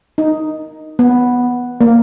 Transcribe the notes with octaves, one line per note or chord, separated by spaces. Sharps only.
D#4
B3
A#3